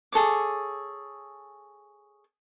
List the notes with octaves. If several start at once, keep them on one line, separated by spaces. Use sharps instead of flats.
G#4 A4 C#5 D6